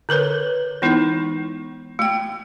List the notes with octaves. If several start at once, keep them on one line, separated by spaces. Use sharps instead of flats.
D3 A#4 B4 C#5
E3 G#3 B3 D#4 E4
A3 G5